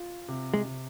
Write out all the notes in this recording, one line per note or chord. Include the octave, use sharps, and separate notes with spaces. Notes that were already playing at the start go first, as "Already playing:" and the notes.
Already playing: F4
C3
G#3
C3